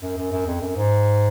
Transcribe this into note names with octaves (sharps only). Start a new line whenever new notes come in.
F#2
F#2
F#2
F2
F#2
G#2